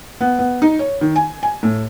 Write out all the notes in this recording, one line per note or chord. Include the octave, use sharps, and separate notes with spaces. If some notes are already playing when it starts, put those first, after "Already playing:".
B3
B3
D#4
C#5
D#3
G#5
G#5
A2